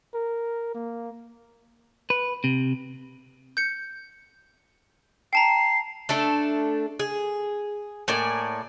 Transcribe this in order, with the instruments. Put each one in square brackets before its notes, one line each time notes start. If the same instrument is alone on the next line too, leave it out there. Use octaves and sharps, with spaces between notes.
[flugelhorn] A#4
A#3
[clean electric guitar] B4
C3
[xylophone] G6 C#7
[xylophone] G5 A5 A#5 [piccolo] C7
[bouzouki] A3 D4 A4
G#4
A2 A#3 D5 G#5